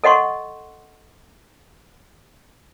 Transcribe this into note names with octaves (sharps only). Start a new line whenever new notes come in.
A4 D#5 F#5 C6 C#6